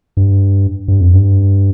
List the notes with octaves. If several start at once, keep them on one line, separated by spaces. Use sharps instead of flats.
G2
G2
F2
G2